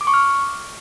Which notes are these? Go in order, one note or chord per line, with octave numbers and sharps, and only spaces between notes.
D6
C#6
F6